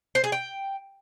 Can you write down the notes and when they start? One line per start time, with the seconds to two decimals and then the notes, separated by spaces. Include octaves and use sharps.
0.15 C5
0.24 G#4
0.32 G5